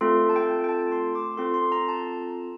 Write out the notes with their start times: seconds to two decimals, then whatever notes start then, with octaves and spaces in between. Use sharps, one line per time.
0.01 A3 C4 F4 A4 C6
0.29 A5
0.36 G5
0.64 G5
0.69 A5
0.92 C6
1.15 D6
1.37 C4 F4 A4 C6
1.54 C6
1.72 A#5
1.88 A5